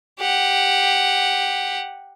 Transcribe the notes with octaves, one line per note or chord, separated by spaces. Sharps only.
G4 F#5